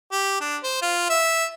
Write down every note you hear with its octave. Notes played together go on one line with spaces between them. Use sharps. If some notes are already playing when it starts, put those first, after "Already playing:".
G4
D4
C5
F4
E5